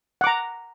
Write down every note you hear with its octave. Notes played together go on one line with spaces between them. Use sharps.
F#5 A#5 D6